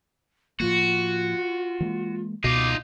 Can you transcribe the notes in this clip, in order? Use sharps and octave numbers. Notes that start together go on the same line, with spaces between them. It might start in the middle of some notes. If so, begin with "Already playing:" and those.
A2 F3 A#3 F4 F#4
E3 G#3 A#3
C#2 B2 D#4 F4 D6